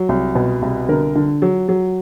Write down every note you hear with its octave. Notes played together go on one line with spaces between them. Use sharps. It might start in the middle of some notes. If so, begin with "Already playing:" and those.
Already playing: F#3
C2
B2
C2
D3 A#4
D3
F#3
F#3